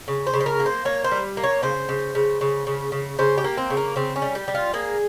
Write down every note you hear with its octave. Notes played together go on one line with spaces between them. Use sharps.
C#3
C5
C#3
C5
A#4
A#3
C5
A#3 C#5
C5
G3
A#3
C#5
C#3 C5
C#3
C#3
C#3
C#3
C#3
C#3 C5
G4
A#3
C4
C#3
A#3
C#3 C4
C#4
G3
G4
G3
F4
A#3 G#4